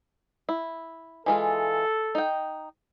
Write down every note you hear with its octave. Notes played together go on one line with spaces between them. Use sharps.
E4
E3 G#3 F4 A4
D#4 G5